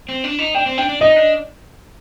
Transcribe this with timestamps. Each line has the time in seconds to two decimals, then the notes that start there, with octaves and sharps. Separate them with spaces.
0.09 C4
0.24 D4
0.39 D#4
0.54 D4 G5
0.66 C4
0.78 D4 G5
0.89 D4
1.01 D#4 D#5
1.16 D4